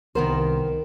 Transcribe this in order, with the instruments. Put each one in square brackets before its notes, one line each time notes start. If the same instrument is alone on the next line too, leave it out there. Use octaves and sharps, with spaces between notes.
[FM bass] C2 [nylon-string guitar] D#3 B3 C5 [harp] A#4 E7